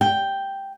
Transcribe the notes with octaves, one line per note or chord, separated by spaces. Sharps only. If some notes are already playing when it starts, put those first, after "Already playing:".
G5